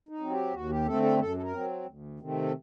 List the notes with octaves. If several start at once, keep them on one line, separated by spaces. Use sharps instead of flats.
D#4
F#3 C4
G4
D#2 F#4
G4
D3 A3 C4 A4
A4
F#2 A4
A4
A#4
F#3 C4
D2
C3 D#3 A3 C4
A4